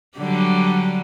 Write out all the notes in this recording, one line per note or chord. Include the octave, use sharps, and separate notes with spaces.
D3 F#3 G3